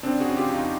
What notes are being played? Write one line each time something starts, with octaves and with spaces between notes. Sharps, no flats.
C#3 C4 D4
F#4 G#4
C#3
F4 G4
F2 D#4 F4